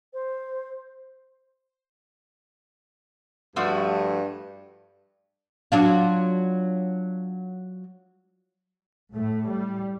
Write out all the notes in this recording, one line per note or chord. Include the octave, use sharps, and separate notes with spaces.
C5
G2 F3 A3 F#4
F#3 D4 F4
A2 A3
G3